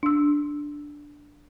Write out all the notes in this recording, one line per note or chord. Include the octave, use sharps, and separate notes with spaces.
D4 E6